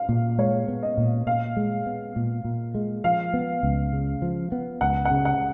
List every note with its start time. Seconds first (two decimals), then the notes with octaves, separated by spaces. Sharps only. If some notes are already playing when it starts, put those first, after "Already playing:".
Already playing: F5
0.09 A#2
0.38 G#3 C#5
0.68 B3
0.83 D#5
0.98 A#2
1.27 A#2 F5
1.57 G#3
1.86 B3
2.16 A#2
2.44 A#2
2.75 G#3
3.04 F3 F5
3.34 B3
3.63 C#2
3.93 C#3
4.22 F3
4.52 B3
4.81 C#2 F#5
5.05 F#5
5.11 C#3
5.25 F#5